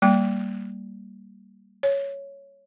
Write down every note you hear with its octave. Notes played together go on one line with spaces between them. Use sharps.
G3 A#3 G5
C#5